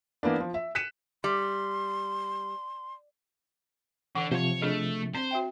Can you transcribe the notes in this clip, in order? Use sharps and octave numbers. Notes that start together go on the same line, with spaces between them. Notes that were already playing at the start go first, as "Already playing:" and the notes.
E3 A#3 B3 D4
F3
E5
F#6 B6 C#7 D#7 E7
G3 C6
D3 E3 F#5 D6
C3 F3 C5 C#5
A3 D4 G#4 D#5
C4 C5
F#4 E5 G5